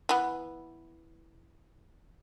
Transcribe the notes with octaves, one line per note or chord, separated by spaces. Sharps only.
E3 B3